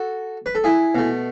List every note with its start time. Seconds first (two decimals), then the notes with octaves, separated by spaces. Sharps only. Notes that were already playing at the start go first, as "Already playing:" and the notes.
Already playing: F#4 A4
0.46 B4
0.55 A4
0.64 E4 G#4
0.95 B2 A3